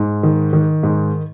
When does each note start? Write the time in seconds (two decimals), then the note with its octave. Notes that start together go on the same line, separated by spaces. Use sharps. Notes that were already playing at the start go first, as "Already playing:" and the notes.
Already playing: G#2
0.23 D#3
0.53 D#3
0.83 G#2